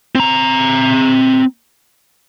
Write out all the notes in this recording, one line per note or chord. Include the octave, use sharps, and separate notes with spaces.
C4 A#5